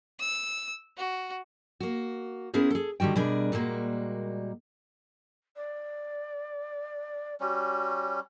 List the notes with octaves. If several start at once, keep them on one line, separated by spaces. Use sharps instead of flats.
E6
F#4
A#3 F#4
B3 C#4 E4 G#4 A#4 C5
G#4 A4
D3 D#3 G3 F#4 G5
B2 G3 D4 G#4 A#4
A#2 G3 G#3 A#3 F#4
D5
G3 C#4 F#4